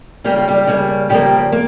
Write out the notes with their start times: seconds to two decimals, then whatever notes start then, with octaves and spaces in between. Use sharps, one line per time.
0.24 C#3 G3 A#3 G4
0.36 F4
0.48 G3 G4
0.67 C#3 G3 A#3
1.09 C#3 F3 G3 A#3 G4
1.52 A#3